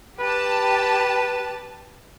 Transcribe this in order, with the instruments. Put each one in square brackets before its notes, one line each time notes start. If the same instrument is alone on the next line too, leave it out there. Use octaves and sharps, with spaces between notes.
[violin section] G4 A5 [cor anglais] B4